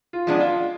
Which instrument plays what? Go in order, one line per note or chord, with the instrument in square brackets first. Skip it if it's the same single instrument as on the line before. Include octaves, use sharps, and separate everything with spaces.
[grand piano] F4
[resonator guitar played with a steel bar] F3 G#3 B3 D4
[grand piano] F4